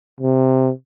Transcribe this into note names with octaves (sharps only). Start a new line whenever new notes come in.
C3